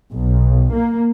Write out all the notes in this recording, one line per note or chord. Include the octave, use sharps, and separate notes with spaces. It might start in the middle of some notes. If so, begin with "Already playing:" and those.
B1
A#3